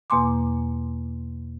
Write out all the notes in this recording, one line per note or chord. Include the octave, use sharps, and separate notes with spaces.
E2 B2 A#3 G#5 C6 D6